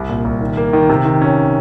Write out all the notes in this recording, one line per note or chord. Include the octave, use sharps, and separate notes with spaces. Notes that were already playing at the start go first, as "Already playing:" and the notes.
Already playing: C2
A#2
C2
D#3
A#3
D#3
C3
D#3
C#4